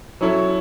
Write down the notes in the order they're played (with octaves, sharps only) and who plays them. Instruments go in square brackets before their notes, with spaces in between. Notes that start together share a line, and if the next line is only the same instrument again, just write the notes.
[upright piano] F#3 C#4 E4 A4